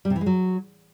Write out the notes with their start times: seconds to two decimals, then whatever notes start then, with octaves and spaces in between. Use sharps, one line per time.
0.05 G3
0.10 C3
0.16 E3
0.21 G#3
0.26 F#3